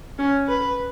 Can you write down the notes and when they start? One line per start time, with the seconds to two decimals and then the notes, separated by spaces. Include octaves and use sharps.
0.18 C#4
0.48 B4